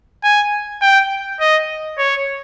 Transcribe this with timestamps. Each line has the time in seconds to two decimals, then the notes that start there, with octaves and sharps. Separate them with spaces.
0.24 G#5
0.82 G5
1.40 D#5
1.98 C#5